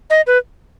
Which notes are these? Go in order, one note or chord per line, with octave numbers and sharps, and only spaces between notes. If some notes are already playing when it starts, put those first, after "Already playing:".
D#5
B4